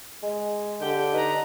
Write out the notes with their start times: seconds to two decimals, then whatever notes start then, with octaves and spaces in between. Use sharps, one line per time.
0.23 G#3
0.81 D3 G4 G5
1.13 D#4 B4 A#5